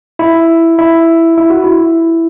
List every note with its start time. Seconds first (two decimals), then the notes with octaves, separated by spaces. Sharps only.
0.19 E4
0.79 E4
1.37 E4
1.50 F#4
1.64 E4